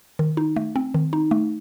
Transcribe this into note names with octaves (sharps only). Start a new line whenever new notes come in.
D#3
D#4
A3
C4
D#3
D#4
A3